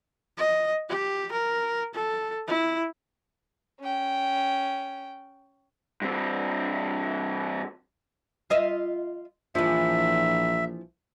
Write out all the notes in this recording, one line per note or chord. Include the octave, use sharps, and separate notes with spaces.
D#5
G4
A#4
A4
E4
C#4 G5
G2 C4
F4 D#5 E5
A#1 E3 F3 E5